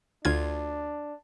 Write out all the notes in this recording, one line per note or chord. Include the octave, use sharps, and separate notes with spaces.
D2 D4 F4 G#6